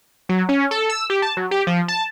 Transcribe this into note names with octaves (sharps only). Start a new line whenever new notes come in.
F#3
C#4
A4
E6
G4
A5
F#3
G4
F3
A5